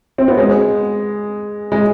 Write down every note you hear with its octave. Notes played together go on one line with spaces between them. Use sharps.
C4
B3
G#3
G#3